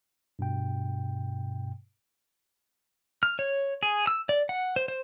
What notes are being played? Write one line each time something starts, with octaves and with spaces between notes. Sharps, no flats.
G2 B2 G5
F6
C#5
G#4
E6
D5
F#5
C5
C5